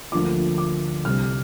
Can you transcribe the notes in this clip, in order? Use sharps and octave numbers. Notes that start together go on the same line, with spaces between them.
D2 D3 F3 A#3 F4 D6
D6
C2 C3 G3 C4 F6